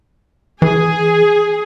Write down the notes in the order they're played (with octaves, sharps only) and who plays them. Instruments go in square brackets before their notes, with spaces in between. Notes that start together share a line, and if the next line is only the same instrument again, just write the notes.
[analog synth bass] E3 [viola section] G#4